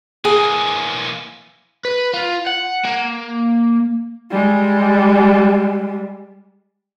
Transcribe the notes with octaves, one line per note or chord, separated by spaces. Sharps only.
E3 A#3 G#4
B4
F4
F#5
A#3
G3 G#3